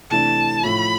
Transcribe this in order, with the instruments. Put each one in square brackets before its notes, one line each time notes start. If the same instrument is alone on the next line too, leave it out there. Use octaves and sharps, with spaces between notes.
[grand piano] C3 E3 A3 D4 [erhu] A5
[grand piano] A2 F3 A3 [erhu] B5